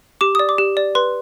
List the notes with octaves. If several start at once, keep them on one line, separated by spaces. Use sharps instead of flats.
G4 D6
D5 D#6
D6
G4
D5
B4 C6